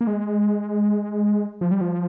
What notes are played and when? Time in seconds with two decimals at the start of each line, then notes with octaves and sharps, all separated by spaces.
0.01 A#3
0.07 G#3
1.61 F3
1.71 G3
1.81 F3